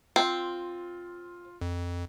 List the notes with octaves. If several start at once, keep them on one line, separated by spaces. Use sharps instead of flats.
C4 F4
F2